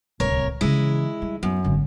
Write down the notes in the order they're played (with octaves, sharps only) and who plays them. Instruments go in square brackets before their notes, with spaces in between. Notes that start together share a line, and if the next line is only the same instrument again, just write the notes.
[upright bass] D1 C2 [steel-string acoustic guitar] A#4 C#5
[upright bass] C#3 E3 [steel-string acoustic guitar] G#3 E4
[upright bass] G3
[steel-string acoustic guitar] F#2 [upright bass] B3
[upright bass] G#1 D3